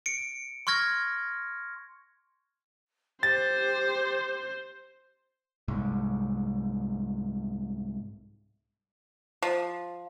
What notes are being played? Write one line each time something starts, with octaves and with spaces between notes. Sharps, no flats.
C#7 D7
C6 C#6 F6 G#6 A#6
G4 C5 A6
C2 G#2
F3